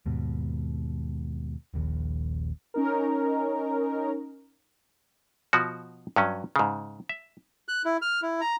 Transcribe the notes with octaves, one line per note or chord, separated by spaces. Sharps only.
D#2 G#2 B2
D#1 A#1 D#2
C#4 D#4 A#4
B2 F3 F#4
G2 F#3 C#4
G#2 C#3
E5
F#6
E4
F6
E4
A#5